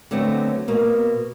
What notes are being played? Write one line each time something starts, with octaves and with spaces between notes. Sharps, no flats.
D3 F#3 A3 B3 C4
B2 A#3